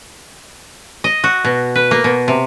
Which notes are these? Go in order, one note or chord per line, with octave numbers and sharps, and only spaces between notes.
D#5
F#4
B2
B4
A#3
B2
C3